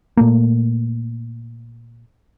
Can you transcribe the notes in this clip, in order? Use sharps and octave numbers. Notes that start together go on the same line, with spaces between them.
A#2 A3 A#3